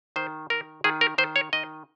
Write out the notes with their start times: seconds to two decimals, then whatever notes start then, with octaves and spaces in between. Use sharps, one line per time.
0.16 D#3 C5
0.50 D#3 A#4
0.84 D#3 G#4
1.01 A#4
1.18 D#3 C5
1.36 C#5
1.53 D#3 D#5